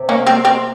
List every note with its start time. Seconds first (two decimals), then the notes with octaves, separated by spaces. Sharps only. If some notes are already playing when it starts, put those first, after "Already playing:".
Already playing: C3
0.09 A#3 C#4
0.27 A#3 C4
0.45 C4